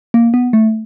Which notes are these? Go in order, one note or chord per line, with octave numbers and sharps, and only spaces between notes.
A#3
B3
A3